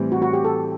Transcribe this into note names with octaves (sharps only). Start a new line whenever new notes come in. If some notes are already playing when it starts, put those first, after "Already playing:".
Already playing: A2 E3 G3 C4
F#4
F#4
G4
A4